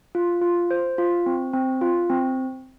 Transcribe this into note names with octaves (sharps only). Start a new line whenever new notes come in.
F4
F4
C5
F4
C4
C4
F4
C4